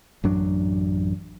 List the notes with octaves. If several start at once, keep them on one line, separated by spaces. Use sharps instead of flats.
A1 F#2 F#3 D4